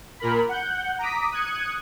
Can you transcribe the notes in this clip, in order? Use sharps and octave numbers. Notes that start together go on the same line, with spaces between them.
A#2 A#4 B5
F#5 G6
A#5 D6 D#6 B6
D#6 F#6 G#6 C#7